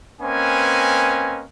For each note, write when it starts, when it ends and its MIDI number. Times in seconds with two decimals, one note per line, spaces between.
0.21 1.43 58
0.21 1.43 60
0.21 1.43 61
0.21 1.43 71
0.21 1.43 75
0.21 1.43 80